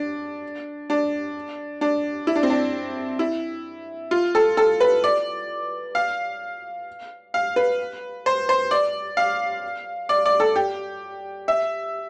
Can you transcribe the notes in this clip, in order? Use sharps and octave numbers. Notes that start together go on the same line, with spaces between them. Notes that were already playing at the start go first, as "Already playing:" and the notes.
Already playing: D4
D4
D4
E4
D4
C4
D4
E4
F4
A4
A4
B4
D5
F5
F5
B4
C5
C5
D5
F5
D5
D5
A4
G4
E5